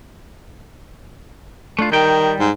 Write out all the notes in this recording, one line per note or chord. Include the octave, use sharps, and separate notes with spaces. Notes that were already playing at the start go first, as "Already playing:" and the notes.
A3 D4 F4
D#3 G3 G5
G#2